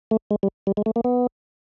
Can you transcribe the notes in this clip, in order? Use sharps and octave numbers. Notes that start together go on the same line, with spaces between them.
A3
G#3
G3
G3
G#3
A3
A#3
B3